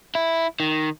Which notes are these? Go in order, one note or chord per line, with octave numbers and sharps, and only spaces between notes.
E4
D#3